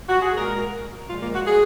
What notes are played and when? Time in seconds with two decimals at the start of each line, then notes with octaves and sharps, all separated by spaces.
0.09 F#4
0.22 G#4
0.35 A#2 G#3 A#4
1.09 A#2 F3 G#3 F4
1.22 A#3
1.35 F#4
1.46 G#4